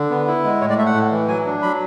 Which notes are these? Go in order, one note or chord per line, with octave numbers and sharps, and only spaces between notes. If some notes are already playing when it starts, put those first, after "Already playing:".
Already playing: D3
B3
E4
G#3
A2 C#5
D5
A3 E5
F#5
A2
E3
F#3 G#5
D4
F#3 B5